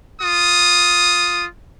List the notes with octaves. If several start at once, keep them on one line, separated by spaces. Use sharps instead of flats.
F4 D#6